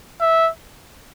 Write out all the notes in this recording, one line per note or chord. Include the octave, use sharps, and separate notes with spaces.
E5